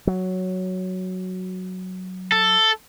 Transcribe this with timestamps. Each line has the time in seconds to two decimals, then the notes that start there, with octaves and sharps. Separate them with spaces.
0.07 F#3
2.32 A4